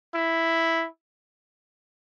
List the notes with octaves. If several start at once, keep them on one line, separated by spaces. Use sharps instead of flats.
E4